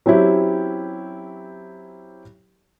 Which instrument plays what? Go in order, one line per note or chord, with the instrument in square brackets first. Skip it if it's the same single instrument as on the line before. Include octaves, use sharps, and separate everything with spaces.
[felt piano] F#3 C4 C#4 E4 G4